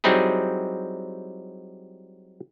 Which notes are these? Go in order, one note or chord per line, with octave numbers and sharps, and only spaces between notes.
F#3 G3 C4 D#4 E4 G#4